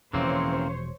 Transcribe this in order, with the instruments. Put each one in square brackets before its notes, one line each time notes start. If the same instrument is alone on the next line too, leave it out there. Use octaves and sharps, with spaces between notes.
[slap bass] E1 F3 [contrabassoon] C#3 [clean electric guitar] E3 A#3 C4 [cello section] C5 C#5